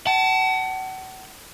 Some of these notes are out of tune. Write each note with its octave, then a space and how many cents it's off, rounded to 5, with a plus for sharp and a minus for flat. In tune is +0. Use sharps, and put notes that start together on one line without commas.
F#5 +35 A5 +0